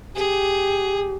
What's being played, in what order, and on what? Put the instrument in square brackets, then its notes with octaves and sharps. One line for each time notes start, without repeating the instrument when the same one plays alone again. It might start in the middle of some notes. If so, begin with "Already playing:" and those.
[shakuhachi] G4 [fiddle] G#4